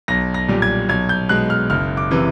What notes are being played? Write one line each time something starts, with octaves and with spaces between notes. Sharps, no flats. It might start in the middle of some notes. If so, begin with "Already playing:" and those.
B1 A#6
A#6
A#2 G3
G#6
B1 G#6
G6
B2 G#3 F#6
F6
F#1 F6
D6
C3 E3